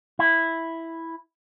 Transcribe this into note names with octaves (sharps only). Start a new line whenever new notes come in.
E4